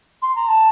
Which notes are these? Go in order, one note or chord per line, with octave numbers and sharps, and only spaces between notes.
C6
A#5
A5